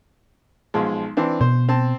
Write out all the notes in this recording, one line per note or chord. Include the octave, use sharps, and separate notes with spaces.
B1 F3 G#3
E3 C4 D4
B2 C5
C4 A5